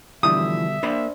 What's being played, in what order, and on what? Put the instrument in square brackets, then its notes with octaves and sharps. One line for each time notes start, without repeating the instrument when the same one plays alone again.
[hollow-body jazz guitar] B2 D3 G3 [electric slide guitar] E3 F3 E4 [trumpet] E5 [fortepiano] D#6
[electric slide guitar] A#3 [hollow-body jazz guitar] D4 C5 B5